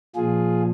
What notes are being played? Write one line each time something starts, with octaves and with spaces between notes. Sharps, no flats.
A#2 F3 F4 G#4